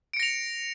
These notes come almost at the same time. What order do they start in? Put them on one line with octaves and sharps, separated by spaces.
D7 C#7 A#6 F7